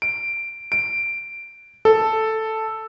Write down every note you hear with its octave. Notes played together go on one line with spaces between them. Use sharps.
D7
D7
A4